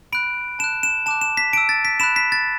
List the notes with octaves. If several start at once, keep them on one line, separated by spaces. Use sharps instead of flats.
B5 F#6 D7
A5 F#6 E7
E7
A5 D6 F#6 E7
E7
B6
A5 E6 D7
A6
B6
B5 F#6 E7
B6
A6